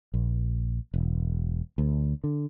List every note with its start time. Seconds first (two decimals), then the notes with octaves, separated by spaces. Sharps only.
0.14 A#1
0.94 E1
1.78 D2
2.24 D3